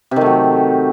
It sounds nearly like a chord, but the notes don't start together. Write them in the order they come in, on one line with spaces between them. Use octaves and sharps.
C3 D#3 A3 F#3